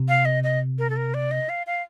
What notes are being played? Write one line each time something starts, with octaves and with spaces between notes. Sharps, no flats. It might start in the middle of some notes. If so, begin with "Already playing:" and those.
Already playing: C3
F5
D#5
D#5
A#4
A4
A#4
D5
D#5
F5
F5